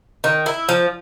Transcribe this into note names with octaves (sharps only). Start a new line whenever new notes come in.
D#3
E4
F3